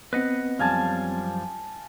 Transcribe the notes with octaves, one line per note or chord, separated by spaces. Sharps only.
B3 C4 B4 D#5 F#5
F#2 F3 G3 F5 G#5 A5